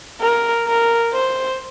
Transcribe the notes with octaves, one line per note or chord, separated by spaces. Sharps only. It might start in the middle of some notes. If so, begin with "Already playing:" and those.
A#4
A#4
C5